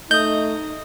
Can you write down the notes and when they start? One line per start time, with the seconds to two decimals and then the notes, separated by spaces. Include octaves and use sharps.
0.11 A3 D#4 D#5 D#6 G6